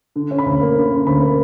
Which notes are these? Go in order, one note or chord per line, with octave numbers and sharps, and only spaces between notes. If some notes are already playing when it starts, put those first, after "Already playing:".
D3
C#4
B5
D2
A#3
D3
C#4
D2 B5
A#3